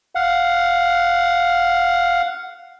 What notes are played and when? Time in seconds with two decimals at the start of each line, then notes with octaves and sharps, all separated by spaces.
0.15 F5 F#5